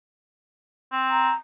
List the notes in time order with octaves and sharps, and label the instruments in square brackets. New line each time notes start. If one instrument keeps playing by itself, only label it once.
[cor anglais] C4
[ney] A#5